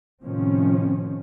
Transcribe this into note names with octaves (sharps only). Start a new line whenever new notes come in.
A2 C3 D#3 F3 C4 C#4